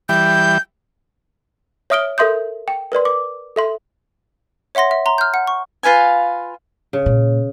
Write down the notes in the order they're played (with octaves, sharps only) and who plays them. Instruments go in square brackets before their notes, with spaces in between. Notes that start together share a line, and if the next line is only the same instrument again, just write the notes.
[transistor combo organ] E3 G3 [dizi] G6
[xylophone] C#5 E5 D#6 F6 D7 G7
A4 A#4 E5 C6 D#6 G6
G5
A#4 B4 D5 C6
D6
A4 E5 C6
C#5 E5 F#5 C6 A#6
E5
A#5 C6
F6 G6
F#5
C#6
[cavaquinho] F4 B4 F5 G#5
[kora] C#3
[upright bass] A#2